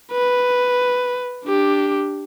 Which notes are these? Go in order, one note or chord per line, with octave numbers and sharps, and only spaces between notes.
B4
D4 G4